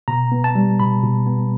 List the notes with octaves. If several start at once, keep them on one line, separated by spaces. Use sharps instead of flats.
B2 A#5
B3
A5
G3
B2 B5
B2
B3